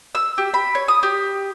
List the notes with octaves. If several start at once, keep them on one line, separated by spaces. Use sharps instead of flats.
E6
G4
B5
C#5
D#6
G4